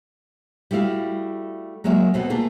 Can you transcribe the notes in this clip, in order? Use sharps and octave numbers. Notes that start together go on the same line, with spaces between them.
G3 A3 E4 F#4 F5
F#3 G#3 A#3 F#4 A#4 E5
D2 B2 A3 C4 F#4 B4
A3 A#3 F4 G#4